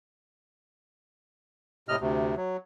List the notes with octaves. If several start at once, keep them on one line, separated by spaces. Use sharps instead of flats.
A2 C3 D#5 F6
D2 C3
F#3